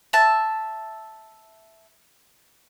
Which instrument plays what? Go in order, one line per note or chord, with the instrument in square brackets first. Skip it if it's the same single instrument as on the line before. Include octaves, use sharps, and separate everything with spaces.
[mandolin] E5 A5